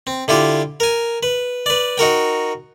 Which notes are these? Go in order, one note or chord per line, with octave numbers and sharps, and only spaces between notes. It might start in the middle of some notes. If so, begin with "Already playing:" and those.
C4
D3 E4 F4 G4
A#4 G#5
B4
B4 D5
D#4 F#4 A#4 G5